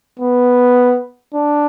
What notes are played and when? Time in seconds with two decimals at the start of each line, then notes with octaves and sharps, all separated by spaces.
0.20 B3
1.34 D4